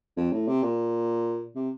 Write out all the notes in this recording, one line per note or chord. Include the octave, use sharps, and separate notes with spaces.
F2
A2
C3
A#2
C3